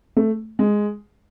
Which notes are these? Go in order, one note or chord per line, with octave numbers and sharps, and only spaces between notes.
A3
G#3